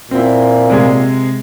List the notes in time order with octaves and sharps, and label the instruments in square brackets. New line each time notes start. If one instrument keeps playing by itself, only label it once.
[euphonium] A#2 [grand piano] C4 E4
[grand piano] C3 G#3 G#4